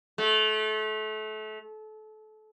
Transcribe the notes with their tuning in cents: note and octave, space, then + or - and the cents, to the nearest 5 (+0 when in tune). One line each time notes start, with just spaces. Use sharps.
A3 -30